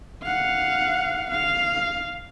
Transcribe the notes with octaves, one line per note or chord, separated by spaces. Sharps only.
F5 F#5
F5